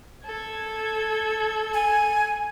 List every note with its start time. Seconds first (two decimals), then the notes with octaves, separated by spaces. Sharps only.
0.24 A4 G#6
1.74 G#5